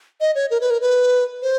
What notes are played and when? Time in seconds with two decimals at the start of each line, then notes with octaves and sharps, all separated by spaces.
0.21 D#5
0.35 C#5
0.51 A#4
0.61 B4
0.71 A#4
0.81 B4
1.42 C5